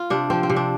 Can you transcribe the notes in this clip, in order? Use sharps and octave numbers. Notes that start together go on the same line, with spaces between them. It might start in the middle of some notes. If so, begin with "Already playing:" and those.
Already playing: F4
C3 D4
F3 C4
C4
C3
D4